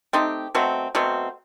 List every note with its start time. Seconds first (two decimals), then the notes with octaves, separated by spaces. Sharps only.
0.13 A3 C4 D#4 G4
0.54 B2 F#3 A3 C4
0.95 B2 F#3 A3 C4